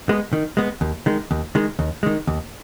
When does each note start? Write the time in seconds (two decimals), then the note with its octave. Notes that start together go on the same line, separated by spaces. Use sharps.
0.09 G#3 B3
0.33 D#3
0.57 G#3 B3
0.81 D#2
1.06 D#3 G#3
1.31 D#2
1.55 D#3 G#3
1.79 D#2
2.03 D#3 G#3
2.27 D#2